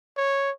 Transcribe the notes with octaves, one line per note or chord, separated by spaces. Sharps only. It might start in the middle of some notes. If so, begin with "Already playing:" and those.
C#5